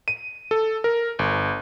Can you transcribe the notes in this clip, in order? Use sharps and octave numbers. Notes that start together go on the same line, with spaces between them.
D#7
A4
A#4
G1